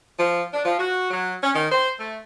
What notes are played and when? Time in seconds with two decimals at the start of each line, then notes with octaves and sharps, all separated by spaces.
0.19 F3
0.52 D4
0.65 F3
0.79 F#4
1.10 F#3
1.43 C#4
1.55 D#3
1.72 C5
2.00 A3